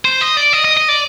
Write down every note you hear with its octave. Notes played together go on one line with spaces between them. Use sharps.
C5
D#5
D5
D#5
D#5
D#5
D5